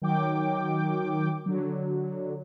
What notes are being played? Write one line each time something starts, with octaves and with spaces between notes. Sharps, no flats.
D#3 F#3 G5 D6
D3 F#3